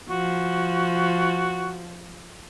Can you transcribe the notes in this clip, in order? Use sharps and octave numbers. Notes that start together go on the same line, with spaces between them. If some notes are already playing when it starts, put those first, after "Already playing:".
F3 F#4